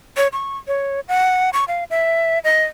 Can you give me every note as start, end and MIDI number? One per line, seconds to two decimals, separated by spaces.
0.17 0.28 73
0.33 0.57 85
0.68 1.00 73
1.08 1.50 78
1.53 1.65 85
1.68 1.84 77
1.90 2.39 76
2.44 2.63 75